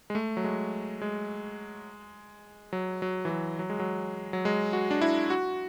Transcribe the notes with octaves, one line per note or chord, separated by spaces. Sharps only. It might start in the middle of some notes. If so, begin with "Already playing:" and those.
G#3
A3
F#3
G#3
G#3
F#3
F#3
E3
F#3
F#3
G#3
F#3
F#3
G#3
F#4
D4
E4
F#4